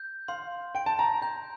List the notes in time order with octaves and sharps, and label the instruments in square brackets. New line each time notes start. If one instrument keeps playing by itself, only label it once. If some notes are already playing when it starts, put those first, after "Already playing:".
Already playing: [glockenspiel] G6
[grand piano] F5 [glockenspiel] C6
[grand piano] G5 [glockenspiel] D7
[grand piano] A5
A#5
[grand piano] A#5 [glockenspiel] G6